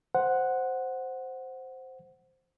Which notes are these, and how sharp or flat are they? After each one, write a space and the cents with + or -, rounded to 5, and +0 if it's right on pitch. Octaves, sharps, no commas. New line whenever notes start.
C5 +0 F#5 +0